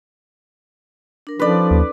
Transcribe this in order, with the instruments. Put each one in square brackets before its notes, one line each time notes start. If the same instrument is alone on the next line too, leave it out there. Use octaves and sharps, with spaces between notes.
[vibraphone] D4 A#4
[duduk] F3 [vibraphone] C#4 D#4 A4 [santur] B4 D5
[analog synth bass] D#2